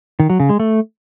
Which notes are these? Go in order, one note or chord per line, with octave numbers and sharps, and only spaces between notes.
D#3
F#3
C#3
G#3
A3